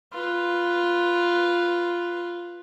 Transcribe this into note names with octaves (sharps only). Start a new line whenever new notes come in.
F4 B4